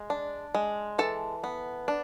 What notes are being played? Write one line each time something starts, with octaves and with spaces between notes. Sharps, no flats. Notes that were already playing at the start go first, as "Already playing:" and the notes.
Already playing: G#3
D4
G#3
E3 A4 A5
B3
D4